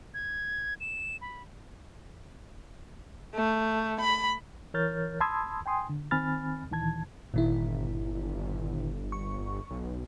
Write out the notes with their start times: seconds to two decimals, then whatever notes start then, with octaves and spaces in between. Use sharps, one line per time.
0.14 G#6
0.80 E7
1.21 B5
3.35 A3
4.00 B5
4.74 E3 A#4 C#5 F6 G6 A6
5.21 A5 B5 C6 D#6 E6 G#6
5.66 G5 G#5 C6 D#6
5.89 D3
6.11 D#3 C4 G#5 B5 F6 A6
6.70 D2 A#2 D#3 E3 A5 G#6
7.34 G1 A#2 D#3 E4
9.12 C#6
9.70 B1